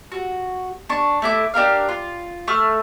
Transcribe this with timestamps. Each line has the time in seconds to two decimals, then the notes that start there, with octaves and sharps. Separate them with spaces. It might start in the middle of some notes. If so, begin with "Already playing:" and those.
0.12 F#4
0.89 D4 C#6
1.22 A3 E4 D6
1.54 D4 G4 A#4 F5
1.89 F4
2.48 A3 A4 C#6 F6